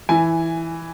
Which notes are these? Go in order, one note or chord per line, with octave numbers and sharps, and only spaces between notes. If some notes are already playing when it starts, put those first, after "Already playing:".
E3 G#5